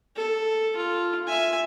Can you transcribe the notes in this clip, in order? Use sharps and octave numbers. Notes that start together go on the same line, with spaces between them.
A4
F4
E5 G#5